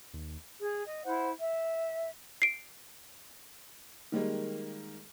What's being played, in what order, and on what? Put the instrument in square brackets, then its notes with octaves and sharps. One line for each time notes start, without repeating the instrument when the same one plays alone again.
[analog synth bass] D#2
[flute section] G#4
D#5
E4 C5 F#5
E5
[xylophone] C7 D7
[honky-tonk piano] D#3 G3 G#3 A#3